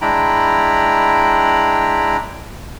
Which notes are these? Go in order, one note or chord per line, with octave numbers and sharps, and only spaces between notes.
G#3 D4 E4 G5 A#5 B5